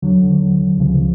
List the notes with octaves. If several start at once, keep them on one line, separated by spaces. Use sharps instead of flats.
D#2 D3 F#3
C#2 C#3 F3